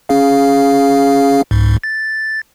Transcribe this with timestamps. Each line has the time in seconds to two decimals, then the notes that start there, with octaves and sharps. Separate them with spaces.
0.09 C#4 G#4 F5
1.51 C2 G#2
1.83 A6